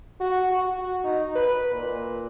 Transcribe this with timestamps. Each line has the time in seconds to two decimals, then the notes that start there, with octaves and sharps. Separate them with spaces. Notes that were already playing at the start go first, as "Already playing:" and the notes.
0.20 F#4
0.52 F#4
1.04 D#4
1.36 B4
1.73 A#2